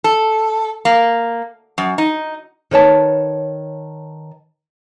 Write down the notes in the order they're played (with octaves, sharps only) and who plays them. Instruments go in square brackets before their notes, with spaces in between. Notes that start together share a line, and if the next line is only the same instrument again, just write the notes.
[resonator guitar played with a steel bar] A4
A#3
F#2
D#4
[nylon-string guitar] D#3 B4 C#5 A5